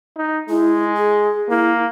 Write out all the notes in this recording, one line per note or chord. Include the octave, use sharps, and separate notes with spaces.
D#4
G#3 E4
G#4
A#3 E4